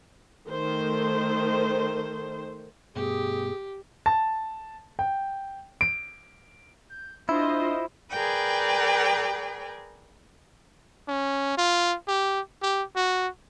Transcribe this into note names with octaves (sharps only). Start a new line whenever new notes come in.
D#3 A3 C5
G2 B2 A3 G4 G#4
A5
G5
D7
G6
D4 E4 F4 C5 D#5
G#4 A#4 B4 D5 G5
C#4
F4
G4
G4
F#4